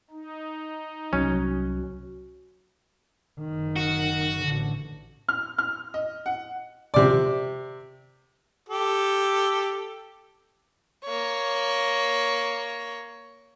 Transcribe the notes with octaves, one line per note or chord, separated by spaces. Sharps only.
D#4
C2 F#3 C#4 F#4
F#1 D#3
F#4
A1 D3
F6
F6
D#5
F#5
C3 D5
G4 A4
A#3 C#5